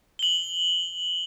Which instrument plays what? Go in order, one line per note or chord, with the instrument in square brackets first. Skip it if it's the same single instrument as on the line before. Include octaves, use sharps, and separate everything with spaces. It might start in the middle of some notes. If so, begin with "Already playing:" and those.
[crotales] F#7 G7